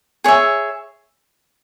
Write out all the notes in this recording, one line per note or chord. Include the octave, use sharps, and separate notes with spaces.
G#4 C#5 E5